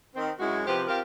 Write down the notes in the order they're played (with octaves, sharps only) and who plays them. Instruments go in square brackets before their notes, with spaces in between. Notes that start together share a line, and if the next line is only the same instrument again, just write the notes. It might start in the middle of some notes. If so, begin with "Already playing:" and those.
[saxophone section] D#3 C4
F#2 G#3 C#4 E4 F#4
C3 F3 G4 B4 C5
C4 F4 G4 A#4